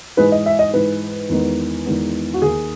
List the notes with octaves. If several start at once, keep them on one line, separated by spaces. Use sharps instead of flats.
G#2 E3 G#3 B4
D#5
E5
D#5
G#2 E3 G#3 B4
E2 D#3 G#3 B3
E2 D#3 G#3 B3
F#4
D#2 D#3 A#3 G#4